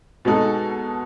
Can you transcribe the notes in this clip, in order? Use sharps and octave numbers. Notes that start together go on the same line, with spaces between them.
B2 G#3 D#4 A4